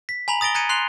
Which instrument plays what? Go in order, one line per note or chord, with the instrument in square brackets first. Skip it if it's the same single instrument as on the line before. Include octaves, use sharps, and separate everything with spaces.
[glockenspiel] B6
G#5 A#5 B5 F7 F#7
D#6 A6 A#6 D7 G7
A#5 F#6 G#6 C#7 D#7
C6 F#6 C7 F7 G7